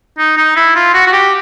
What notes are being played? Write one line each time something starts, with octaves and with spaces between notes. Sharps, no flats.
D#4
D#4
E4
F4
F#4
F#4
G4